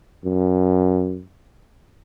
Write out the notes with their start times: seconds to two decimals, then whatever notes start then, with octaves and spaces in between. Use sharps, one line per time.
0.25 F#2